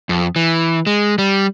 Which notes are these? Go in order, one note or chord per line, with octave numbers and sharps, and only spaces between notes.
F2
E3
G#3
G3